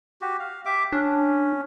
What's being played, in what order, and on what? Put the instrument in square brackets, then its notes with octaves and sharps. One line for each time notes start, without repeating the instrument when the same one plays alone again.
[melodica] F#4 G4
F5
G4 E5 D6
[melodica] C#4 [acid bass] D4